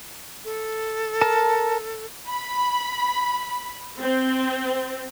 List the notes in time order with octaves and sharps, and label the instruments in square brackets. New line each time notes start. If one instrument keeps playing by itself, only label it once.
[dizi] A4
[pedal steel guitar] A#4 A5
[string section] B5
C4